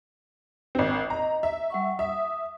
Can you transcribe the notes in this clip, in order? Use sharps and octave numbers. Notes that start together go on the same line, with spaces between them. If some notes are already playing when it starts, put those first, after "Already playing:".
G#1 C4
D#5 A#5
E5
G3 F#5 C#6
E5 D#6